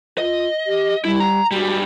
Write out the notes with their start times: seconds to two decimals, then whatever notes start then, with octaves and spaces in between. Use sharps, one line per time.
0.18 F4 D#5
0.67 G4
1.05 G3 E4
1.20 A#5
1.52 G#2 G3 F#4